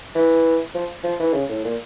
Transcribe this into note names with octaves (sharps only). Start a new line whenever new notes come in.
E3
F3
F3
E3
C#3
A2
A#2